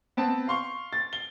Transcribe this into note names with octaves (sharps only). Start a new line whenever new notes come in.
B3 C4 A5
F5 C6 C#6
A6
G7